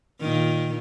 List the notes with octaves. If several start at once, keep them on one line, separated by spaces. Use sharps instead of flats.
A#2 D#3